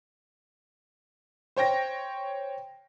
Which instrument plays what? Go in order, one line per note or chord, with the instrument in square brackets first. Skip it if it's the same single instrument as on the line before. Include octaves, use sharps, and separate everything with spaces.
[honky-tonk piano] C5 C#5 G5 A#6